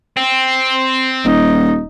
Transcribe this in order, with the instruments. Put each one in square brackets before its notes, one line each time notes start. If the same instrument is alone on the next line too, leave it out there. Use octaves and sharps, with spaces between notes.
[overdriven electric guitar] C4
[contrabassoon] D#1 [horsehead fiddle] D#4